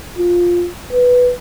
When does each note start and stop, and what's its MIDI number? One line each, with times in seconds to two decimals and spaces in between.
0.18 0.69 65
0.93 1.32 71